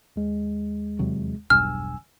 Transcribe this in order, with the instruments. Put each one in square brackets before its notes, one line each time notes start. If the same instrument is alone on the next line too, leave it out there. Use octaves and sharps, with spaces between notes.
[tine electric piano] D#2 G#3
[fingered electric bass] E2 C3 F#3
[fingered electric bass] E1 B1 G2 [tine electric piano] G#5 E6 [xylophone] F6